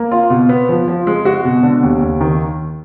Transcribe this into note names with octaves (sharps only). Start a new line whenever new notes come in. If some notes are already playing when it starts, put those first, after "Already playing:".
Already playing: A#3
F4
B2
B3
F3
F3
G#3
F#4
B2
D3
D#2
D#2
D#3